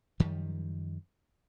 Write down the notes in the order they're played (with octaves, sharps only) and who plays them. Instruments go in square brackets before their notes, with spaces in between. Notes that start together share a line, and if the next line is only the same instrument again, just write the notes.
[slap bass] F#2 D#3 F3 G3